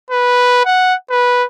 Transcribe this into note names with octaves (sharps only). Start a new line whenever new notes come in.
B4
F#5
B4